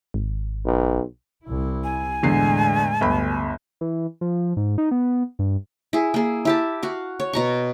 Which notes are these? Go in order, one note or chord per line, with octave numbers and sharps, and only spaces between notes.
G#1
B1
C2 E4
G#5
E2 A2 D3 G#3 C7
G1 D2 B5
E3
F3
G#2
D#4
B3
G2
E4 G#4
A#3 G#4
E4 G4 A5
F#4 F5
C#5
B2 A#5 C#6